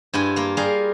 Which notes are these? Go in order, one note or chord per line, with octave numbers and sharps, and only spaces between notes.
G2 E4 F4 G#5
A#3 F4
G3 G#4 A#4 F5